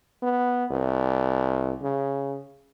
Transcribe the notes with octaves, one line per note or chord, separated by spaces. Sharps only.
B3
C2
C#3